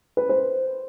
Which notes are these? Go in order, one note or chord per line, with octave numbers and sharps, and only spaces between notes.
B4
C5